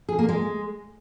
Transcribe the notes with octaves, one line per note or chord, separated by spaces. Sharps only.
G#4
A#3
G#3